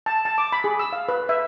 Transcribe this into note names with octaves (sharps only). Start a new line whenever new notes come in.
A5
A5
D6
B5
G#4
E6
F5
B4
E5